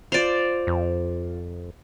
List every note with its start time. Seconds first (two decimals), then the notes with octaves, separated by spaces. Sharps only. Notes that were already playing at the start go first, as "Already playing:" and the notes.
0.12 F4 C5 D5 F7
0.67 F2